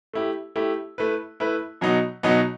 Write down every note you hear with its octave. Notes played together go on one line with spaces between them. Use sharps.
A3 E4 G4
A3 E4 G4
A3 E4 B4
A3 E4 B4
B2 F#3 B3 D#4
B2 F#3 B3 D#4